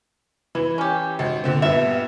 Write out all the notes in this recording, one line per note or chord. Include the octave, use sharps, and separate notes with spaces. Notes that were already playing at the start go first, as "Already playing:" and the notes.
E3 E4
C#4 G4
G#1
A#2 D3 C4
G2 A#2 B3 E5